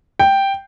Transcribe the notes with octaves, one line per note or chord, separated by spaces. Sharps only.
G5